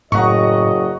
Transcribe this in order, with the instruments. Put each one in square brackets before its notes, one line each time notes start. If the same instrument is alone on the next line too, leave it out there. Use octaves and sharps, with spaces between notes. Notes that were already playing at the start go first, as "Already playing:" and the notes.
[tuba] F#1 [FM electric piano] A2 [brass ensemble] D#5 [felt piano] F#5 A#5 C#6